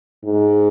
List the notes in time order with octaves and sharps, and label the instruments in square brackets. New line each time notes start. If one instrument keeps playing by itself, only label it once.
[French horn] G#2